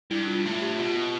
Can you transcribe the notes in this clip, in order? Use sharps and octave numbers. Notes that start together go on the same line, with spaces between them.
G2 E4
F4
A2 F4
G4
B2 F4
G4